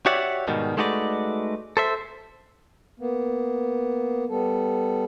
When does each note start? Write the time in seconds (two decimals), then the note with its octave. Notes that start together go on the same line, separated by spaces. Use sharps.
0.06 F#4 G4 C#5 D5 E5 F#5
0.47 G#2 B2 D#3 G3
0.77 G#3 A3 D#4 F#4 B4 D5
1.77 A4 C5 E5
3.00 A#3 B3
4.29 G3 B3 A4